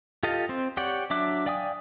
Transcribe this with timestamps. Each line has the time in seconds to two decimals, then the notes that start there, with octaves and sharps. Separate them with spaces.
0.23 F4 G4 A4 D#5 F5
0.49 C4 C5
0.77 G4 C#5 D5 F#5 G5
1.10 F#3 D4 E5 D6 F#6
1.46 D5 F5 G5 G#5 D#6